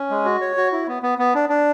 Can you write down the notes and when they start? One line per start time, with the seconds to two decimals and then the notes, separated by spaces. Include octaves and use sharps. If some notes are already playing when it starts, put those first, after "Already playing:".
Already playing: C#4
0.10 G#3
0.25 F#4
0.41 C#5
0.57 F#4
0.72 E4
0.88 B3
1.03 B3
1.19 B3
1.35 D4
1.49 D4